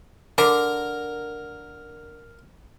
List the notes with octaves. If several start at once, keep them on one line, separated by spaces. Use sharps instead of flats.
D3 A#4